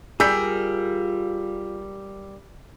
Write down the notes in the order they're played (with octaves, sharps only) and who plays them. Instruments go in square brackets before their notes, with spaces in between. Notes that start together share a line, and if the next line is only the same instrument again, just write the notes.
[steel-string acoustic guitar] G3 A#4 [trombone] F4 [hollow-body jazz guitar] G#4 [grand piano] E6 G6 B6